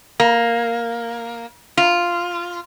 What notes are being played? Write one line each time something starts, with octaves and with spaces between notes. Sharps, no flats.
A#3
F4